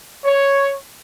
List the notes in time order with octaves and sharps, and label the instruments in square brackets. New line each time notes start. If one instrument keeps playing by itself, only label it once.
[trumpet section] C#5